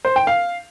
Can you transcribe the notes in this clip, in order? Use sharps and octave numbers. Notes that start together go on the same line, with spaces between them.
C5
G5
F5